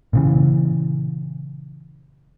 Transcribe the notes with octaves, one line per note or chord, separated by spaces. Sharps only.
A#2 C#3 E3